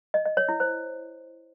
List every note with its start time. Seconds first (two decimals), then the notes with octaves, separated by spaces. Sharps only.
0.14 D#5
0.26 D#5
0.37 C#5
0.49 E4
0.60 C5